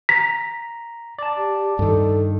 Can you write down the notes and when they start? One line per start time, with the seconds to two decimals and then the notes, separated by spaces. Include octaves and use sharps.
0.09 A#5 B6
1.19 D5 A5
1.37 G4
1.79 G2 D#3 A4